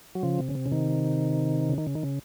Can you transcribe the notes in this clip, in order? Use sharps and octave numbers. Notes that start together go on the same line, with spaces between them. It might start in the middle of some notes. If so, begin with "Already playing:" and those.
F#3
C#3 F3
C3
C#3
C3
C#3
C3 D#3
C#3
D#3
C#3
D#3
C#3